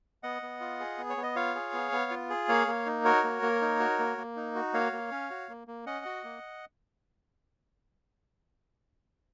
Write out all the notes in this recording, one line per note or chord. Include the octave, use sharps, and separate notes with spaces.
B3 D#5 F#5
B3
F4
G#4
B3
C#5
B3
D#5
F4 C#5 F5
G#4
B3
B3
F4
G#4
A#3 C#5 F5
A#3
D#4
F#4 A#4 C#5
A#3
A#3
D#4
F#4
A#3
A#3
D#4
F#4
A#3 C#5 F5
A#3
C#4
F#4
A#3
A#3
C#4 D#5 F#5
F#4
A#3